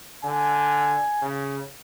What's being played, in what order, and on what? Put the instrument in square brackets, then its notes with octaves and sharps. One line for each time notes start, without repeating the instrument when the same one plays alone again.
[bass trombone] D3 [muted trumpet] G#5
[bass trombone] C#3